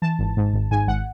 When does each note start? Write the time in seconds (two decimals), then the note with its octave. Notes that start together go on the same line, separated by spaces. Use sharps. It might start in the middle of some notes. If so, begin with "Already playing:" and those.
0.02 E3 A5
0.19 G#1
0.37 G#2
0.53 G#1
0.71 G#2 G#5
0.87 G#1 F#5